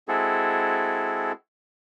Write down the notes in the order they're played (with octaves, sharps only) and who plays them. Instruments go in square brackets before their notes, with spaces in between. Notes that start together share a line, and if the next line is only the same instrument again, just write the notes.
[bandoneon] G#3 C4 E4 F#4 G#4 A4